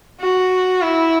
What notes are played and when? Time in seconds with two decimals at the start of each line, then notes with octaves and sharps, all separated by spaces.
0.21 F#4
0.82 E4